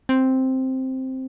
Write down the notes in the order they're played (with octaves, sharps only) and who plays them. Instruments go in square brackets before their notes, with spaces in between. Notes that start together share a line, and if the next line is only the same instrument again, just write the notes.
[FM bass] C4